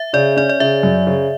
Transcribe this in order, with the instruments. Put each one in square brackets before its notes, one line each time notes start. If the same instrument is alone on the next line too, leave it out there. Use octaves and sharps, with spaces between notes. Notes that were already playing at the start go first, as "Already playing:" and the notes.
Already playing: [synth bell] E5
[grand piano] C#3 [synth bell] D5
[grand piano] C#4 [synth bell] D5
[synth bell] D5
[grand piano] C#3 [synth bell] E5
[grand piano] F#2
C#3